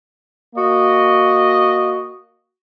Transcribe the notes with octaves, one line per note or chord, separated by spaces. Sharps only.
A#3 F#4 D#5